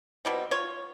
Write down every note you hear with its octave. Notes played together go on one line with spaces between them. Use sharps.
B2 G3 C4
F4 C#5